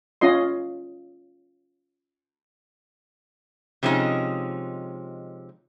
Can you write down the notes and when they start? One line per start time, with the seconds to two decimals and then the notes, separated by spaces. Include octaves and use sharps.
0.21 C#4 F4 D#5 C6
3.83 C3 F3 G#3 C#4 D#4